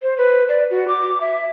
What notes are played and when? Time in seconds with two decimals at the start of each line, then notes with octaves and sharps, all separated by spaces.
0.02 C5
0.18 B4
0.49 D5
0.71 F#4
0.88 D6
1.21 E5